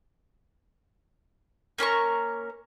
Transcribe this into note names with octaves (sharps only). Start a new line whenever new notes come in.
A#3 C#4 A#4 C#6